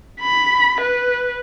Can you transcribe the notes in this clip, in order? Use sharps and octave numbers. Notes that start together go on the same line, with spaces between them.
B5
B4